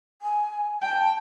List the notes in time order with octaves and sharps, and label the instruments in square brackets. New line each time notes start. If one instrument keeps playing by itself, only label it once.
[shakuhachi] G#5
[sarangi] G5 [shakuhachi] A5